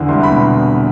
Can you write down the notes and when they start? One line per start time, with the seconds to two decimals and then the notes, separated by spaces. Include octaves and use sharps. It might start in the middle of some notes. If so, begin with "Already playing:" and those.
Already playing: E2 D3
0.09 C2 C6
0.23 B5
0.31 B2